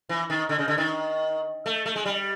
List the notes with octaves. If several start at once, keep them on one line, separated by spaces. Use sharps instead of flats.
E3
D#3
D3
C#3
D3
D#3
A3
A3
G#3
G3